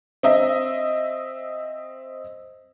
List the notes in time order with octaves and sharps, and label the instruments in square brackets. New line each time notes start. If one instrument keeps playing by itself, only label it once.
[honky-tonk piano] C4 D#5 E5